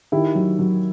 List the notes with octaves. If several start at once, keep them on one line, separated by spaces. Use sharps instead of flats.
D#3 E4 G4
F#3
F#3